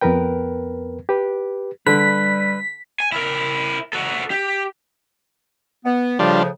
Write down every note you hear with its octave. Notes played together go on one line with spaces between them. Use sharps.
F2 B3 A#4 B4 G5
G4 B4
D3 G3 B4 B6
G#5
E4 A#4
F#4 A4
G4
B3
A2 C#3 F3 G3 D4 F4